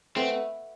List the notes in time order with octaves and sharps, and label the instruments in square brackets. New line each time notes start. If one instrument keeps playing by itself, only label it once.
[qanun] A3 B3 [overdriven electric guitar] C4